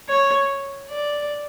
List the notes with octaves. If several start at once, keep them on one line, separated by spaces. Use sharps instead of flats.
C#5
D5